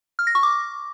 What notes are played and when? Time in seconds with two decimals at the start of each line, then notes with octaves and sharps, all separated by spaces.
0.19 F6
0.27 A#6
0.35 C#6
0.43 D6